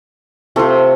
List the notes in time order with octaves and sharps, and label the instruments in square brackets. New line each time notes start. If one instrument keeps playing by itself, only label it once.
[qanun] C3 F4 [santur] A3 A4 C6